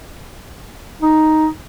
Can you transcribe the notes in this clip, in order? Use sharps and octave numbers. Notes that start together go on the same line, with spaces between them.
D#4